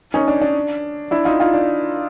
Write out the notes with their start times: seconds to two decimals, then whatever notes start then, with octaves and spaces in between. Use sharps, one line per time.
0.14 C#4 D#4
0.28 D4
0.42 D4
1.11 D4 E4
1.25 D#4 F4
1.40 D#4 F4
1.53 D4